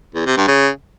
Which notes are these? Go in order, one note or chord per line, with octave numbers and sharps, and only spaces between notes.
E2
C3
G2
C#3